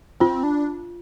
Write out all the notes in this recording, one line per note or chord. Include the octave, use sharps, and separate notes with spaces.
C4 F4
D4